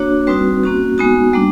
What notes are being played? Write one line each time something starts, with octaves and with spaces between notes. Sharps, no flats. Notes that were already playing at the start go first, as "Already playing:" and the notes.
Already playing: A#3 D4 F#4 C#5
G3 C4 D#4 F#4 B4
A#3 C#4 F#4
G#3 B3 D#4 F#4
G3 A#3 D4